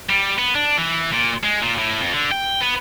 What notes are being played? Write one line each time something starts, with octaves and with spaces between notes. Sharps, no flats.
G3
B3
D4
E3
A#2
G#3
A#2
A2
F2
D3
G5
B3